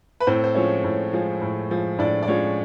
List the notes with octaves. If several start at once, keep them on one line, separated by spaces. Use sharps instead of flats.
B4
A2 C4 C5
C5
F3 G#3 C#4 C#5
A2
F3 G#3
A2
F3 G#3
A2 D4 D5
D5
F3 G#3 C#4 C#5